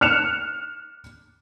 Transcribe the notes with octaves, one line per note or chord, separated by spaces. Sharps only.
F6 F#6 C#7 E7 F7